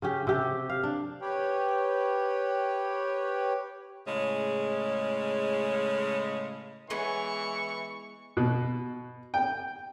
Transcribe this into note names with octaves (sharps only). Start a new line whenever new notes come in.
C#3 C#4 G4
C3 G4 A4
F5
D4
G4 B4 C#5 G5
A2 C#3 G#3
E3 G#3 B3 C#5 C#6
B2
G5